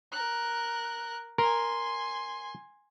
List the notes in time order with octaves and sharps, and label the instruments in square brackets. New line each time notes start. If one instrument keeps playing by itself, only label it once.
[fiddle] A#4 F#6
[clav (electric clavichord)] A#4 [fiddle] G#5 C6